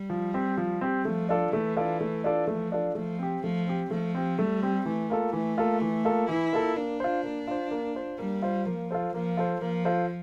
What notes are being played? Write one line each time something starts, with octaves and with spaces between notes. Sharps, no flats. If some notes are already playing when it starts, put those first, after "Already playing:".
Already playing: G3
F3
C4 G4
F3
C4 G4
F3 A3
D4 F4 A4 D5
E3 A3
D4 F4 A4 D5
A3
D4 F4 A4 D5
F3 A3
D4 F4 A4 D5
F3 A3
C4 G4
F3 A3
C4 G4
F3 A3
C4 G4
G3 A3
C4 G4
E3 A3
A#3 F4 A4
E3 A3
A#3 F4 A4
E3
A#3 F4 A4
E3 E4
A#3 F4 A4
A#3 D4
F4 C5
A#3
F4 C5
A#3
F4 C5
G3 A#3
F4 C5
F3 A#3
F4 A4 C5
F3 A#3
F4 A4 C5
F3 A#3
F4 A4 C5